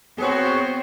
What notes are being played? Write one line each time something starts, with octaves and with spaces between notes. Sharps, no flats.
B3 C4 F#4 G#4 C5 C#5